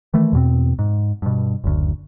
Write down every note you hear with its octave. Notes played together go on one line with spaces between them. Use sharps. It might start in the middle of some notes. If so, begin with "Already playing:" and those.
D#3 E3 A3
E2 B2 C4
G#2
G2 B2
F#1 D2